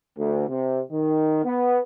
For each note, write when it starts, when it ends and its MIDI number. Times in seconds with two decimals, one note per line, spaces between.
0.18 0.44 38
0.48 0.81 48
0.91 1.40 51
1.44 1.79 59